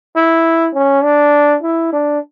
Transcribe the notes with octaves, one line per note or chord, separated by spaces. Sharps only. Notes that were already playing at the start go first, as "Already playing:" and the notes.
E4
C#4
D4
E4
D4